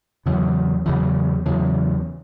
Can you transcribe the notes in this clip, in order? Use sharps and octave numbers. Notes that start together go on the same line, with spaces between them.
E2 C#3 F#3
E2 C#3 F#3
E2 C#3 F#3